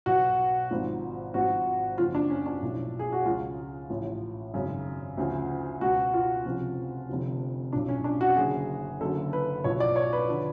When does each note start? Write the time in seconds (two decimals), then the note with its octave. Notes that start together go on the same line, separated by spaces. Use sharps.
0.06 B1 B2 F#4
0.71 G#1 G#2 F3
1.34 G#1 G#2 F3 F#4
1.98 F#1 F2 C#3 F4
2.15 D4
2.30 C#4
2.46 D4
2.63 B1 A2 F3
2.99 G#4
3.12 F#4
3.26 C#2 C#3 F3 F4
3.90 A1 A2 F3
4.54 G#1 F#2 C#3
5.18 D2 C#3 F3
5.81 C#2 B2 F#4
6.14 F4
6.45 F1 F2 C#3 F3
7.09 F1 F2 D3 F3
7.73 B1 A2 F3 D4
7.88 C#4
8.04 D4
8.21 F#4
8.36 F#1 F#2 D3 G#4
9.01 F#1 F#2 D3 A4
9.33 B4
9.64 B1 A2 F3 C#5
9.80 D5
9.96 C#5
10.13 B4
10.28 D3 F3